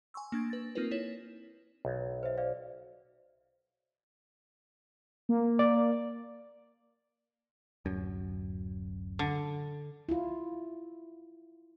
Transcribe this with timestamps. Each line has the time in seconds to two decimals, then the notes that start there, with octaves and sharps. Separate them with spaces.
0.14 G#5 C6 C#6 E6
0.32 A#3 D4 G#6 A#6
0.50 B4 A6
0.75 A#3 C4 D#4 F4 A#4 B4
0.91 E4 C#5 E7
1.85 B1
2.23 C5 E5
2.37 C5 D5 F5
5.29 A#3
5.59 D5
7.85 D1 F#2
9.19 D3
10.09 E4 F4